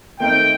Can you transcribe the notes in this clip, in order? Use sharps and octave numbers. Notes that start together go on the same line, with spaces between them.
D#3 A3 C4 D#4 A#4 G5